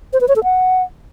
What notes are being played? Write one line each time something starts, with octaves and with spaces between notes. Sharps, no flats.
C5
B4
C#5
A4
F#5